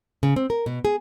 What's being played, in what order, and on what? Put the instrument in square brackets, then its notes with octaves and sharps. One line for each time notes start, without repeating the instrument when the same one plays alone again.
[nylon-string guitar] C#3
C4
A#4
B2
G#4